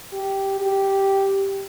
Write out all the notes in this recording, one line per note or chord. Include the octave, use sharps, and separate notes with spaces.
G4
G4